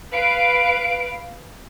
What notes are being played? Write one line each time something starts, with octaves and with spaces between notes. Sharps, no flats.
B4 F5 D7